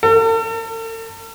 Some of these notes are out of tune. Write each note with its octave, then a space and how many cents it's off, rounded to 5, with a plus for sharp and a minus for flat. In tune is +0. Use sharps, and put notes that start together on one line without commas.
A4 +45